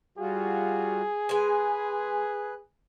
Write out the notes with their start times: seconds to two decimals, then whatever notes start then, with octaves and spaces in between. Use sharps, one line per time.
0.18 G3 F4 F#4 G#4
1.29 G#3 B4 G#5